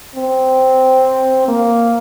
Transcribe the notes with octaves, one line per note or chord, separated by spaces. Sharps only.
C4
A#3